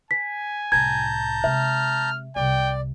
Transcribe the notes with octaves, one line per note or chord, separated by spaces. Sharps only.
G#5 B6
C2 A2 A5 A#5 G6 G#6
C3 G#3 E5 F6
C2 C3 D5 G5